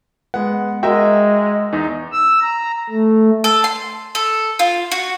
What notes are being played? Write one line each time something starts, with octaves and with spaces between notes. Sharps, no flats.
G#3 B3 F#5
G#3 F#4 A#4 D#5 E5 G5
E2 D#4
E6
A#5
A3
A4
C6
A4
F4
F#4